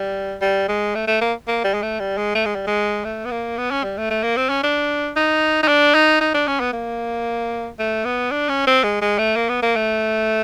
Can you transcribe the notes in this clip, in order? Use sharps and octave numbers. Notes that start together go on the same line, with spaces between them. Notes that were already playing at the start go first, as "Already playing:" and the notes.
Already playing: G3
G3
G#3
A3
A3
A#3
A#3
G3
G#3
A3
G3
G#3
A3
G#3
G3
G#3
A3
B3
A#3
B3
C#4
G3
A3
A3
A#3
C4
C#4
D4
D#4
D#4
D4
D#4
D#4
D4
C#4
B3
A#3
A3
B3
D4
C#4
C4
G#3
G#3
A3
A#3
B3
A#3
A3